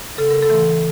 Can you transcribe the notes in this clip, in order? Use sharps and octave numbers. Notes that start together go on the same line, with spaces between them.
C#3 A4
A#4
A4
E3 A3